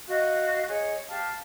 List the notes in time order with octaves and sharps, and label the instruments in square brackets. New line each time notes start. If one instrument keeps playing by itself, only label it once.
[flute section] F#4 D#5 F5 F#6
G#4 C#5 D#5
G4 F5 A5 F6